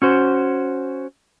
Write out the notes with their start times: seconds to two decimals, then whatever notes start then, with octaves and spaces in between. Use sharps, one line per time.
0.02 C#4 F#4 C5